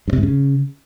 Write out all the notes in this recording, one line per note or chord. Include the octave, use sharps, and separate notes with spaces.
G2
C3
G#2
C#3